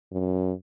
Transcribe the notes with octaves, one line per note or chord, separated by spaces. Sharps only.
F#2